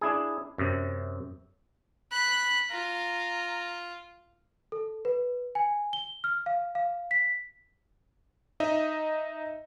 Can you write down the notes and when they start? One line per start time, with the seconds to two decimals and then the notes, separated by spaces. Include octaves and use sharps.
0.01 D4 E4 G#4
0.58 F#2 C3
2.12 B5 F#6
2.70 F4 A#5
4.72 A4
5.05 B4
5.55 G#5
5.93 G7
6.24 F6
6.46 F5
6.75 F5
7.11 B6
8.60 D#4 D#5 E5